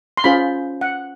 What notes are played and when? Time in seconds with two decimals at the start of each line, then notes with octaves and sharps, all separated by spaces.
0.17 C6
0.24 C#4 F4 G#4 C5 B5
0.81 F#5